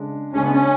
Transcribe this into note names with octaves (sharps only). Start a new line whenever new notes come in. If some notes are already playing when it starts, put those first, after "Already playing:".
Already playing: C#3 G#3 D4
C#3 G#3 C#4 D4
B3
C#4